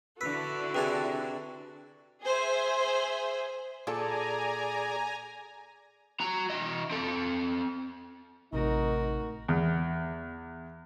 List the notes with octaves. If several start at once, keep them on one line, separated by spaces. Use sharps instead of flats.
D3 E4 F#4 A4 B4 E6
C3 D4 G#4 B4 G#5
G#4 C5 E5
A#2 G#4 A4 D5 G#5 A#5
F#4 A#5
E3 D#5
C4 A4
A1 C3 A3 D#4 F#4 A#4
E2